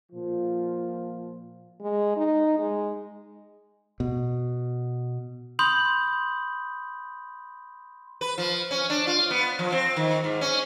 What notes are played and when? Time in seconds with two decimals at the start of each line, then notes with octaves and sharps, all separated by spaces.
0.10 A#2 F3 F4
1.81 G#3
2.17 D#4
2.59 G#3
4.00 B2
5.59 B5 C6 D#6 G6 F#7
8.21 B4
8.38 F3
8.71 C#4
8.90 D4
9.07 F4
9.31 B3
9.59 F3
9.72 C4
9.96 D#3
10.24 G#2
10.41 C#4